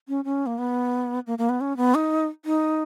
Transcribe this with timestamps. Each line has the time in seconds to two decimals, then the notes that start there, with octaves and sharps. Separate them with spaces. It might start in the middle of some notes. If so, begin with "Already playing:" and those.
0.08 C#4
0.25 C#4
0.46 A#3
0.58 B3
1.27 A#3
1.38 A#3
1.49 B3
1.61 C#4
1.77 B3
1.95 D#4
2.45 D#4